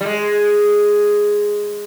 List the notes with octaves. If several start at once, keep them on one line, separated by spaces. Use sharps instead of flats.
G3
G#3